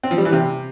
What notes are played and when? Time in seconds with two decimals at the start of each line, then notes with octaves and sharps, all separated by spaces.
0.03 C4
0.11 F3
0.18 G3
0.25 E3
0.32 C3